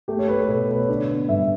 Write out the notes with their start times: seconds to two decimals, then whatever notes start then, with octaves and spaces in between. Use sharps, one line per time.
0.08 A3 G4
0.19 C#5
0.28 A3 B4
0.38 A4
0.48 B2 B4
0.69 B2 B4
0.80 C#5
0.88 D3 D5
1.08 B3
1.29 G2 E5